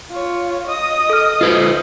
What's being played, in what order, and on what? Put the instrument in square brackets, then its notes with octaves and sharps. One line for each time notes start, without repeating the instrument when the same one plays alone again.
[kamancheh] F4 C#5
D#5 D#6
[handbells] A4 F6
[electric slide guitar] F4 B4 C5